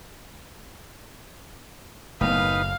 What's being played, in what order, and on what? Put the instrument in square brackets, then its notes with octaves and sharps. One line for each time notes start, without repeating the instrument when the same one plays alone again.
[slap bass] F#1 [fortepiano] A2 A#3 B3 [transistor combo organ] D#4 B4 [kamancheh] F5